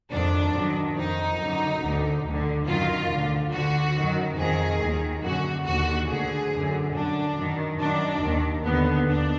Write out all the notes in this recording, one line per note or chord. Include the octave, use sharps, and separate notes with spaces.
F2 D#3 D4
F#2 D#3
F2 D#3 D#4
F#2 D3
D2 D3
D2 D3
F#2 D#3 F4
D2 D3
D2 D3 F#4
F#2 D#3
F2 D#3 G#4
D#2 D#3
F#2 D3 F#4
D#2 D3 F#4
D2 D3 G#4
F#2 D3
F#2 D3 D4
F#2 D#3
F#2 D#3 D4
D#2 D#3
D#2 D3 B3
D#2 D4